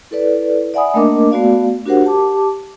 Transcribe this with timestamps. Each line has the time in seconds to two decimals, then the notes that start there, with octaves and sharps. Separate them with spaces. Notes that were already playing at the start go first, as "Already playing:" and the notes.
0.11 E4 A4 B4 D5
0.74 D5 E5 F#5 G#5 B5 D#6
0.94 A3 A#3 D4 A#4 D#5 D6
1.31 A3 B3 F#4 D5 F5
1.85 D4 F#4 G4 A#4 C5 F#5
2.04 G4 A5 D6